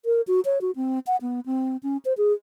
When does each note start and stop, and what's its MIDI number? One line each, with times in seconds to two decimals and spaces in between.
0.05 0.21 70
0.27 0.40 66
0.45 0.61 73
0.61 0.71 66
0.76 0.99 60
1.07 1.16 78
1.22 1.40 59
1.46 1.77 60
1.83 1.97 61
2.05 2.13 72
2.17 2.33 68